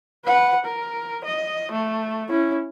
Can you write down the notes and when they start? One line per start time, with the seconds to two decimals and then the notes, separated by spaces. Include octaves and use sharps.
0.25 B4 F#5
0.65 A#4
1.25 D#5
1.72 A3
2.29 C#4 E4